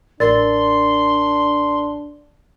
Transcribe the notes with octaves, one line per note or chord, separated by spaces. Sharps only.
A1 D4 A#4 D5 C6 A6